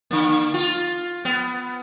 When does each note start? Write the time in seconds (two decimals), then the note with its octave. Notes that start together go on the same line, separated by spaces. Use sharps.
0.11 D3 A#3
0.54 F4
1.25 B3